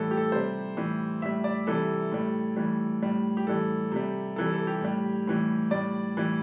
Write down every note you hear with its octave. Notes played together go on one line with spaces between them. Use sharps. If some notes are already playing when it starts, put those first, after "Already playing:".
Already playing: A2 E3 G3 A4
G4
A4
C3 G3 C5
A2 E3 G3
A2 G3 E5
D5
C3 E3 G3 A4
A2 G3
A2 E3 G3
A2 G3
G4
A2 E3 G3 A4
C3 G3
C3 E3 G3 A4
A4
G4
A2 G3
A2 E3 G3
A2 G3 D5
A2 E3 G3